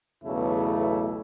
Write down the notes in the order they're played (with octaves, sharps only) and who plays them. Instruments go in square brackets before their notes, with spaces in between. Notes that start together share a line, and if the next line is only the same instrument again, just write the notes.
[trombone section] B1 E2 A2 C#3 A3 E4